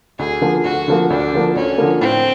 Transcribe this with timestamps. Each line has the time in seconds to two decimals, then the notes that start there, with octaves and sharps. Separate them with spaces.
0.19 D2 G#4
0.41 D3 F3 A#3
0.64 D2 F#4
0.88 D3 F3 A#3
1.10 D2 D4
1.34 D3 F3 A#3
1.56 D2 C#4
1.78 D3 F3 A#3
2.01 A2 C4